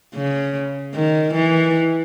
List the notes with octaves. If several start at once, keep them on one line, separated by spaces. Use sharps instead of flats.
C#3
D#3
E3